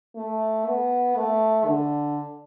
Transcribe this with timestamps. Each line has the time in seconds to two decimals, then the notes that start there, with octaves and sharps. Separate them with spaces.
0.16 A3
0.66 B3
1.16 A3
1.66 D3